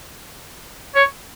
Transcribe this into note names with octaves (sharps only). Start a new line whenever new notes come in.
C#5